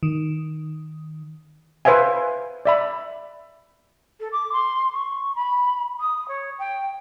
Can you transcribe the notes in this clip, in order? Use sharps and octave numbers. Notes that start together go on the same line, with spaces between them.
D#3
B4 C5 E5 F5 G#5
D5 E5 B5
A4
D6
C6
C#6
B5
D#6
C#5
G5